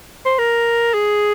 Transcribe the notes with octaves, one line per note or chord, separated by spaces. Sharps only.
C5
A#4
G#4